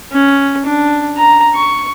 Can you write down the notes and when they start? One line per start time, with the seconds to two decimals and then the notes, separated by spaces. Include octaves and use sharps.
0.12 C#4
0.66 D4
1.17 A#5
1.55 C#6